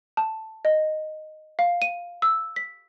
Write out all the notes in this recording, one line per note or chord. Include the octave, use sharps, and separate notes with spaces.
A5
D#5
F5
D#7
E6
B6